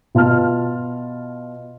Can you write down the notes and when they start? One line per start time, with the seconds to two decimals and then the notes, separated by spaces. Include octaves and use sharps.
0.15 B2 F4 A5 F6